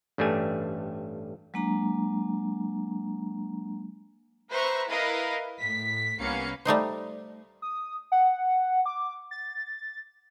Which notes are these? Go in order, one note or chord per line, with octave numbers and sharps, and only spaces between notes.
A1 G2 G3 A3 G#5
F#3 G#3 A#3 D4 A#5
B4 C5 E5 A#5 C#6
E4 A#4 B4 D#5 F5
A2 B6
C2 A#3 B3 C#4 F5 C#7
G3 A3 D#4 C5
D#6
F#5
D6
A6